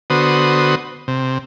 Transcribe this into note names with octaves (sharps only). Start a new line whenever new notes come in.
D3 B3 F#4 C5 D#6
C3